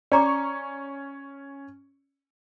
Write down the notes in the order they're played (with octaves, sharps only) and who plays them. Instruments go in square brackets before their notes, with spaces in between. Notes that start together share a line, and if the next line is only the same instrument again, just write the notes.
[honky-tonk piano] C#4 C#6 [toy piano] D5 A#5 D6